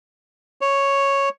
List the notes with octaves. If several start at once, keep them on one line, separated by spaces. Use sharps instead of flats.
C#5